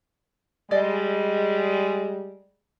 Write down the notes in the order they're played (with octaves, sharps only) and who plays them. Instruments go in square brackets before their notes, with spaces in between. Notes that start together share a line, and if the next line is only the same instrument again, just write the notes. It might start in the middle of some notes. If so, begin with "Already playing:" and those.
[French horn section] G3 G#3 [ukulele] D5 D#5